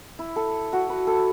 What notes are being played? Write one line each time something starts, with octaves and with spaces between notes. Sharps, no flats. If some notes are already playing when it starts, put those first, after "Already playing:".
E4
A4
F#4
B4
A4